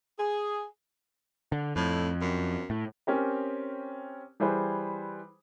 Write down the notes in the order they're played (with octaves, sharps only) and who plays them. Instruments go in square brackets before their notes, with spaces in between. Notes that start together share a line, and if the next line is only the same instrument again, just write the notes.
[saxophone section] G#4
[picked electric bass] D3
[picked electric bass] F2 [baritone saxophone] A2
[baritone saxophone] F#2
[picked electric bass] A2
[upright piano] C4 C#4 G4 A#4
E3 G3 G#4 B4 C5